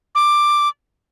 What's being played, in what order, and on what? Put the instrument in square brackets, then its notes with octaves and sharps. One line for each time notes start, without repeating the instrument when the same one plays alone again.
[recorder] D6